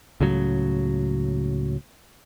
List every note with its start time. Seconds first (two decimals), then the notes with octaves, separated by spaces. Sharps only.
0.20 C#2 A2 C#3 F#3